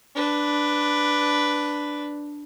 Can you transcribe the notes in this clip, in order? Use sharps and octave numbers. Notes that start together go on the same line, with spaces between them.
D4 B4